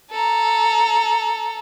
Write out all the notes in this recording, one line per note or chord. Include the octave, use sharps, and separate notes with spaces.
A4 A#5